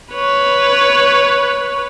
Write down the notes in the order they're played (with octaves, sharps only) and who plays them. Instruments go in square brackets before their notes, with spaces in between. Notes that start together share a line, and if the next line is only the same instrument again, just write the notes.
[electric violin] B4 C#5